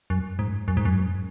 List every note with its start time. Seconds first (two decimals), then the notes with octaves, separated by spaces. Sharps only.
0.10 F#2
0.39 G#2
0.68 F#2
0.77 G#2
0.85 F#2